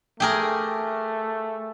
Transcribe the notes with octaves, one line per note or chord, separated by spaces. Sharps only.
A3 G4 G#4 A#4